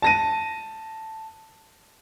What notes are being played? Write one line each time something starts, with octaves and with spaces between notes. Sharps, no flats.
A5 A#6 D#7